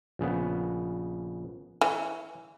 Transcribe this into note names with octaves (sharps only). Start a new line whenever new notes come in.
A#1 C#3 B3
E3 C#5